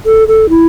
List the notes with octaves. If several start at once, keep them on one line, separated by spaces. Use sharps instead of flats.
A4
A4
E4